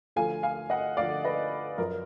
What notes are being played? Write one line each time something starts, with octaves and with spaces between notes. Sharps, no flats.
D2 D3 F3 F5 G#5
F5 G#5
D#5 F#5
D2 D3 F3 D5 F5
B4 D#5
F#2 F3 A#4